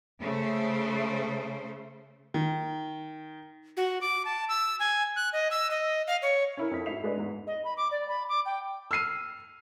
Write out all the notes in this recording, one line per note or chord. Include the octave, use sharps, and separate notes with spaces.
C#3 A3 C5
D#3
F#4
D6
A5
E6
G#5
F#6
D#5
E6
D#5
F5
C#5
C#4 E4 A#4
F2 B6
G#2 F#4 E5 C7 F7
G#3 D4 B4 D#5
E2 G#2
D#5
B5
D6
D5
B5
D6
G5
E6 F6 C7 D#7